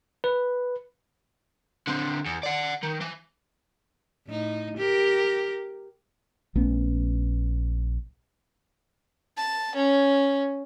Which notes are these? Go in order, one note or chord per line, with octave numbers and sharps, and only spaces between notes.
B4
D3 C4
E2
D5 F#5
D#3
E3
A2 D#4
G4 A#4
A#1 A3 B3 C#4
A5
C#4